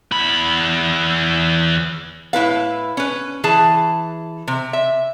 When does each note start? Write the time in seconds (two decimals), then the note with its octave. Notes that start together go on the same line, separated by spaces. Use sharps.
0.12 E2 B5
2.33 A2 E4 B4 F5
2.97 C#4 B4
3.44 E3 G#4 A5
4.48 C3
4.73 E5